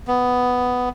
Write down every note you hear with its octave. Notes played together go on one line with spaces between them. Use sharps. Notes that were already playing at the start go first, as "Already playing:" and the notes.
B3